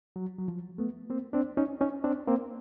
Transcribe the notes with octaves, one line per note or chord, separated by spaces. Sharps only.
F#3
F#3
F3
A3 B3
A#3 C4
C4 D4
C#4 D#4
C#4 D#4
C4 D4
A#3 C4